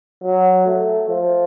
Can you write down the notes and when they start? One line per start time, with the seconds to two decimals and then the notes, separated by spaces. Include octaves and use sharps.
0.24 F#3
0.67 A3
1.09 F3